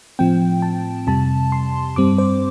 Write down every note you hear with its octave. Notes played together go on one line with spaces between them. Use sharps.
A2 F3 C4 G5
A5
F2 C3 G3 A5
C6
G2 G3 C4 D6
C5